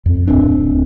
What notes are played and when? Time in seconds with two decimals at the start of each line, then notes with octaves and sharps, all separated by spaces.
0.06 F2
0.27 D1 C4 D4